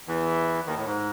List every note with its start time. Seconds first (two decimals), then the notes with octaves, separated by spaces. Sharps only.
0.07 E2 E3
0.66 D#2 D#3
0.76 A2
0.86 G#2